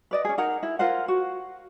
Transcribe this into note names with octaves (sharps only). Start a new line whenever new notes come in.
B4 D5 D#5
C#4 G#4
D#4 A#4 F#5 A#5
E4
F4 A#4 C5 F#5
F#4